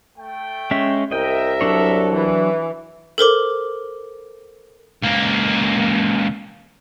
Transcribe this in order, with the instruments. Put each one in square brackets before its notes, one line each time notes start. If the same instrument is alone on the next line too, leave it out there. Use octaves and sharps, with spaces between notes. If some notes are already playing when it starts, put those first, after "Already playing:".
[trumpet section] A3 G5
[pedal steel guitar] G#3 C#4 E5
[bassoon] C2 [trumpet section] A#4 E5 [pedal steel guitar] D#5 G5
[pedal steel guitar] F#3 D4 C#5 [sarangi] A4
[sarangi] E3 [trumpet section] B4
[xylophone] A4 A#4 C5 D6
[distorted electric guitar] C#2 A#3